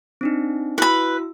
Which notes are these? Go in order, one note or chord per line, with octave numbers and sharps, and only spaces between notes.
C4 D4 D#4
E4 F#4 B4 B5 E6